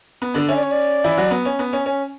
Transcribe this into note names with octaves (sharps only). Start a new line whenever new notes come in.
B3
D3 D4
C#4 E5
D5
C#5
D5
E3 E4
F#3 F#4
B3
C#4
B3
C#4
C#4